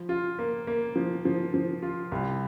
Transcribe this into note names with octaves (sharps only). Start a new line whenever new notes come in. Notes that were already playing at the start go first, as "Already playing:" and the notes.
Already playing: F3
F4
A#3
A#3
F3
F3
F3
F4
C2